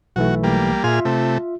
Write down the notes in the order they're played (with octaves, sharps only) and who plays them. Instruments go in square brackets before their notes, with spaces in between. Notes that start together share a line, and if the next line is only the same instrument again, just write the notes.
[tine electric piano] B1 E3 A3 [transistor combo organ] F#4
[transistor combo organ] G3 A#3
[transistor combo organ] A#2 G#4 F6 [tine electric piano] F4 E5
[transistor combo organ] C3 A3